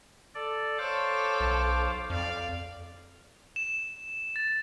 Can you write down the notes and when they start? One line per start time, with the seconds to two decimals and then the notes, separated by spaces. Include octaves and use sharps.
0.35 A4 D5
0.78 A4 C5 C#5 F5 D6
1.40 B1
2.10 F2 D5 F5
3.56 E7
4.36 A6